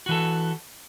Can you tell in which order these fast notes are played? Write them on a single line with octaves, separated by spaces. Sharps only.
F#4 E3 A4